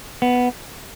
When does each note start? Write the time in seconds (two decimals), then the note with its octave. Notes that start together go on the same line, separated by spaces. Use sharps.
0.22 B3